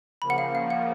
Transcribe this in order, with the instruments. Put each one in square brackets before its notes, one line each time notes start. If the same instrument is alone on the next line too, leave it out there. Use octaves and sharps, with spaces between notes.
[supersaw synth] C#3 F3 A#3 [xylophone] B5
[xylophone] F#5
F5
F5
F#5